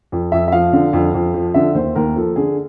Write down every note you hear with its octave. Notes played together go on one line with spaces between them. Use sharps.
F2
F2 E5
E5
F3 F5
D3
F2
F2
F3
D3 E5
D#2 C5
D#2 A#4
F3 A4
D3 G#4